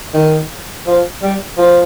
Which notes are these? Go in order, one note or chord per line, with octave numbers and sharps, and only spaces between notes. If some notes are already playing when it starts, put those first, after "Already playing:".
D#3
F3
G3
F3